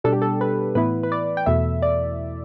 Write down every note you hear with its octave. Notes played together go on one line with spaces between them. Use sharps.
B2 G3 D4 A4
G4
A4
B4
A2 E3 B3 E4 B4
B4
D5
G5
E2 B2 A3 E4 E5
D5